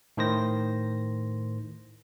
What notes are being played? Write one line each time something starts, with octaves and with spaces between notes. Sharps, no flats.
A2 D#3 C5 A#6